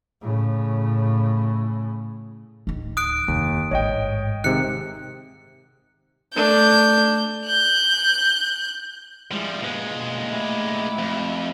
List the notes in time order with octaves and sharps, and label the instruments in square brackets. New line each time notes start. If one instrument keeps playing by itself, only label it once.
[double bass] A2 C#3
[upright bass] D1 D#3
[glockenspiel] D#6 F#6 D7
[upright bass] F1 C3 [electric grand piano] D#2
[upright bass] A1 G#2 [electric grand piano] C#5 D#5 G5
[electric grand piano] G#2 C3 D#3 [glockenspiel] F#6 C#7
[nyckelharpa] A3 D4 [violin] G6
[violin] F#6 G6
[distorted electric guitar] F3 G3 [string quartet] G#3 E4
[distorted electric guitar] A#2 G#3 [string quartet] B3
[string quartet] B2
A3 E4 G4
[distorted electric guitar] F2